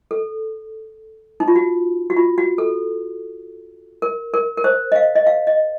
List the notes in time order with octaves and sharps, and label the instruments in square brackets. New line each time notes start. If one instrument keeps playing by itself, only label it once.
[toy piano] A4
D#4
F4
F#4
F#4
F4
F#4
A4
A#4
A#4
A#4
C5
D#5
F5
D#5
F5
D#5